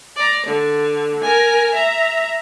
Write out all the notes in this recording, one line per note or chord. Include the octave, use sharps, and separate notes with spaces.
D5 A#5
D3
A#4 G#5
E5 A#5